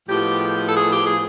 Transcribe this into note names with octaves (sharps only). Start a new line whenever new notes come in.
A2 F3 G#3 B3 G4
A4
G#4
G4
G#4